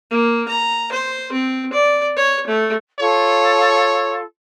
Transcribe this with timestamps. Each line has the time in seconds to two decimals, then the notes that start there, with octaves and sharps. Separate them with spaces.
0.11 A#3
0.48 A#5
0.92 C5
1.32 C4
1.73 D5
2.17 C#5
2.47 A3
2.99 F4 A4 C#5